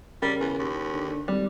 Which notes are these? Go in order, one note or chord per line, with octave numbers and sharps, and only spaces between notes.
C#3 G3 A#4
E2
D#2
D3
D3
G#1 G3